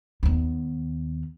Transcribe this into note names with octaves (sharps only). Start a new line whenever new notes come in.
D#2 B3